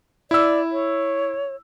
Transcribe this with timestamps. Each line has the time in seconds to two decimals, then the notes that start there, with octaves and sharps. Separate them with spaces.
0.31 E4 D5 E6
0.72 C#5